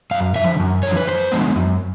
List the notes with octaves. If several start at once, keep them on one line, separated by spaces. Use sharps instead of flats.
F#2 F5
D3 F3 E5
F#2
D3 F3 C#5
B4
F#2 C5
D3 F3 G#3 B3
F#2